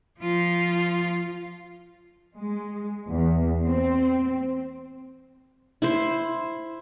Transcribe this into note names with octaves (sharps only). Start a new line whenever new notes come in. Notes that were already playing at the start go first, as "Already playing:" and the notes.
F3 F4
G#3
E2
C4
E4 C5